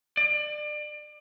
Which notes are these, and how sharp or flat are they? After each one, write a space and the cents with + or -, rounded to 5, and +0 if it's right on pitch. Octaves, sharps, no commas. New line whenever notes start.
D5 +30